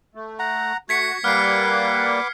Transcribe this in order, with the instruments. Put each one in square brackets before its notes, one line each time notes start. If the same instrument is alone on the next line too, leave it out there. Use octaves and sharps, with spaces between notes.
[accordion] A3
[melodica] F#5 A#5
[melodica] A3 [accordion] F#4 [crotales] G#6 B6 C#7
[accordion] G3 A#3 [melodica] B4 F#5 D6 [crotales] F6 C7